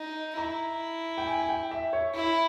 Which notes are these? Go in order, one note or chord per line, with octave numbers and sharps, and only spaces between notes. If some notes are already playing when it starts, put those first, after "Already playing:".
Already playing: D#4
E4 A#5
G5
G#5
G#5
G5
E5
C#5
E4 E5